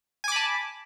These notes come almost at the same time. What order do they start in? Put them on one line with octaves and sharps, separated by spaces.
G#5 D6 B5 A5